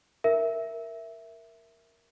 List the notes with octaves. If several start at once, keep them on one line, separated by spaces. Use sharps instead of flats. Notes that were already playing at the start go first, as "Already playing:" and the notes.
A#4 E5